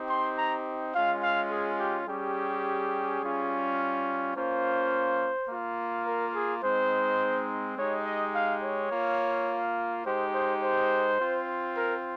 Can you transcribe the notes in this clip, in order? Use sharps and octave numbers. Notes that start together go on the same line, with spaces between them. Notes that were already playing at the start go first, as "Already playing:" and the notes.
Already playing: C4 D#4 G4
C6
A#5
G#3 C#4 F4 F5
F5
G#4
G4
G3 C#4 G4 G#4
G3 C#4 F4
A#3 C#4 F4 C5
A#3 F4
A#4
G#4
G#3 C4 D#4 C5
G#3 D#4 G4 C#5
D#5
F5
C#5
A#3 F4
G#3 D#4 G4 C5
C5
C5
C4 F4
A#4